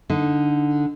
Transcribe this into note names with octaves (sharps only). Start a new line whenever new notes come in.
D3 D#4